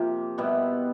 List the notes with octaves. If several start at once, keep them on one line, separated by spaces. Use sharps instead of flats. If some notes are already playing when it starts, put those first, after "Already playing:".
Already playing: C3 F3 A#3
B2 G3 B3 E4